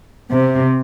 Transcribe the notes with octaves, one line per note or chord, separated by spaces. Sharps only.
C3